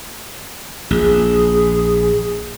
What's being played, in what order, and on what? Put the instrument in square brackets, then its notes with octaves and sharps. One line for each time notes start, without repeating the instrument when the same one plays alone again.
[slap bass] A#1 [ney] G#4